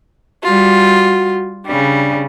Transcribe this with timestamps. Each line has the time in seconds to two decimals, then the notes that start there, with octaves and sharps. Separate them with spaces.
0.44 G3 F4 F#4
1.67 C#3 G3 D4